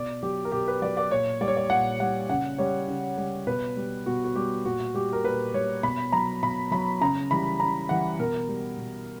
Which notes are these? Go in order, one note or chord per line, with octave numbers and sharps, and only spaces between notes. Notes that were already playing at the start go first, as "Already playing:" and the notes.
Already playing: B2 D5
F#3 G4
A#4
B2 G4
B4
F#3 D5
D5
A#2 C#5
G3 D5
C#5
D5
A#2 F#5
G3 F#5
C#3 F#5
G3 C#5
C#3
G3
B2 B4
G3
B2 F#4
F#4
G3 G4
A#2 F#4
G3 G4
A#4
A#2 B4
G3 C#5
B2 B5
F#3 A#5
B2 B5
F#3 B5
C#3 A#5
E3 G3 B5
C#3 A#5
E3 G3 F#5
B2 A#4
G3
B2